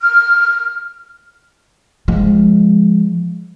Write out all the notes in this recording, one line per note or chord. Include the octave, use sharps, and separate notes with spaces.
F6
F3 G#3